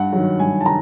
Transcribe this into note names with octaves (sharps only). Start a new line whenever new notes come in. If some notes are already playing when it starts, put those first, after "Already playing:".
Already playing: G2 F#5
D#3 F#3
G2 G#5
A5
D#3 A#5